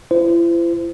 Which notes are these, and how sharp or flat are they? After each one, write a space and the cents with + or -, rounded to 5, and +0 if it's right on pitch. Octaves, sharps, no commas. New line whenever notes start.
E4 +45 C5 -30